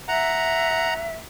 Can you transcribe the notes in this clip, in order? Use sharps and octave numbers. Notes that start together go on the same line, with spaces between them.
E5 F#5 A#5